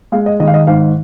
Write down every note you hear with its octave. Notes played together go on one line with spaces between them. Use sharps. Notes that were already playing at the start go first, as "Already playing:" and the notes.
G#3 F5
D#5
D#3 D#5
F5
D#5
G#2 F5